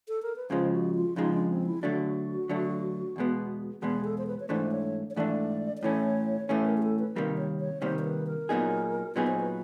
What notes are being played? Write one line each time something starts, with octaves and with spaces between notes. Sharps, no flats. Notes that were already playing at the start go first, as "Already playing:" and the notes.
A4
A#4
B4
F2 C#3 F3 G#3 C5
F#4
F4
F2 C#3 F3 G#3 D#4
D4
C4
E4
D3 F#3 A3 D4 F#4
D3 F#3 A3 D4
E2 B2 G#3 B3
E2 B2 G#3 B3 G#4
A4
C5
B4
C#5
G#2 E3 A3 D4 C5
C#5
C#5
G#2 E3 A3 D4 D5
D5
A2 E3 A3 C#4 C#5
A2 E3 A3 C#4 B4
A#4
G#4
A4
B4
C3 D#3 G3 A#3
C#5
C#5
C3 D#3 G3 A#3 C5
C5
B4
A#4
A#2 F#3 B3 D#4 G#4
A#2 F#3 B3 D#4 G#4 B4
C5
B4